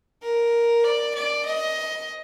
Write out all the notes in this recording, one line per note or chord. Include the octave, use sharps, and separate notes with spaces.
A#4
D5
D5
D#5